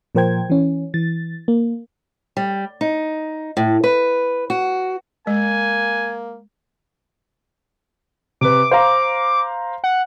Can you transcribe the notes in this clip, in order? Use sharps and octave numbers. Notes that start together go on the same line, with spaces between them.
A#2 F3 A#4 C5 G5 G#6
E3 C#4
E3 A6
A#3
G3
D#4
A2
B4
F#4
G#3 A#3 G#5
C3 B4 D6
C5 F5 A#5
F#5